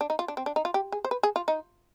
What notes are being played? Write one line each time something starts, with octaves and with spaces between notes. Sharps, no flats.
D4
D#4
F4
D4
C4
D4
D#4
F4
G4
G#4
C5
B4
G#4
F4
D#4